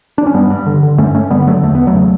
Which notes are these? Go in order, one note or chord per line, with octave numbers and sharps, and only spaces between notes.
D4
C#4
G2 G3 B3
G2
D3
D3
G2 A3 C#4
G2 A3 C#4
D3 G3 B3
B3
D3 F#3 A3
E2 A3
E2 B3
F#3 A3
C#3